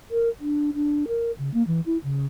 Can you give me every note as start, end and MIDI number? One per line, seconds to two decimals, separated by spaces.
0.11 0.29 70
0.40 0.71 62
0.74 1.04 62
1.08 1.32 70
1.38 1.52 49
1.54 1.63 58
1.67 1.81 52
1.86 1.98 64
2.04 2.26 49